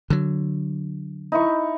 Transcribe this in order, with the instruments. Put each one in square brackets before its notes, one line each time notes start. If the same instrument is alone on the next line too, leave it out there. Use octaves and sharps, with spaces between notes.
[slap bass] D3 F#3
[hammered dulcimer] D#4 E4 C#6